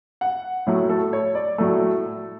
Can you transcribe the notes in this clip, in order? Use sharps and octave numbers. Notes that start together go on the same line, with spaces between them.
F#5
A2 F#3 A3 C#5
A4
C#5
D5
A2 F#3 A3 A4